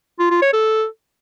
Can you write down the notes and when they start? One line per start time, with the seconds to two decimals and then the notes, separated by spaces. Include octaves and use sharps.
0.20 F4
0.31 F4
0.42 C#5
0.53 A4